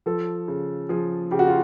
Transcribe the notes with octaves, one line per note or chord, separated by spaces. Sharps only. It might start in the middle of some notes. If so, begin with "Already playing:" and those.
F3 A4
C#3
F3 G#4
C#3 G4
F#4
F4